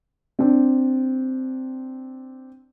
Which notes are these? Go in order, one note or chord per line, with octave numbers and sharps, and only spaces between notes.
C4 D4